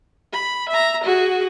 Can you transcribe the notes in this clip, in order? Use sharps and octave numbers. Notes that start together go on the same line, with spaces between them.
B5
E5 A#5
F#4 G#4